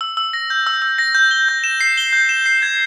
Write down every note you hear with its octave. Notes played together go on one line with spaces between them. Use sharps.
E6
E6
A#6
G6
E6
E6
A#6
G6
G7
G6
E7
C7
G7
G6
E7
C7
G#6